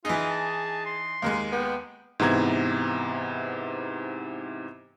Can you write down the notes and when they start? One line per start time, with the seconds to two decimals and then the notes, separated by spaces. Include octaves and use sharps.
0.05 E3 D#4 F4 G#4
0.30 A5
0.86 C6
1.22 D#2 D#3 G#3
1.52 B3 G5
2.20 G#2 C3 E3 B3 A#5 G#6